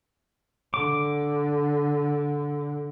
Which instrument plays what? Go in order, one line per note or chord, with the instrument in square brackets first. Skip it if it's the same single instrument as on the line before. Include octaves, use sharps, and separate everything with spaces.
[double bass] D3 [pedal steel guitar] D6